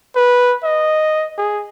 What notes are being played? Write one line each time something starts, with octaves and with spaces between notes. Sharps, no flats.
B4
D#5
G#4